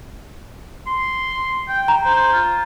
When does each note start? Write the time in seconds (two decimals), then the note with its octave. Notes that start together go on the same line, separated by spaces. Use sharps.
0.87 C6
1.68 G5
1.88 A#5
2.05 C5
2.33 F4